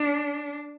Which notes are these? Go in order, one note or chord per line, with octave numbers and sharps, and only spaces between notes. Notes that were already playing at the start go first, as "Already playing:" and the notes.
Already playing: D4